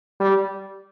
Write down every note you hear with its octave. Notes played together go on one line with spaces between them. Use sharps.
G3